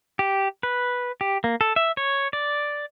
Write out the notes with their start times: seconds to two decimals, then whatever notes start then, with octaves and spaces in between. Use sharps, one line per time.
0.19 G4
0.63 B4
1.21 G4
1.44 A#3
1.61 A4
1.76 E5
1.97 C#5
2.33 D5